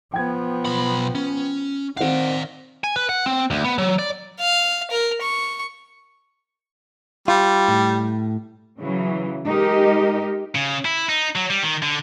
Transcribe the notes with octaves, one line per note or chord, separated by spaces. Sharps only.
F3 B3 G5 G#6
B1 B5
C#4
D#3 C4 D5 F5 F#5
G#5
B4
F#5
C4
D2
B3
F#3
D5
F5
A#4
C#6
G3 F4
A2
C#3 E3 F#3
G#3 D#4 G4 A#4 D#5
C#3
E4
D#4
F#3
G3
D#3
D3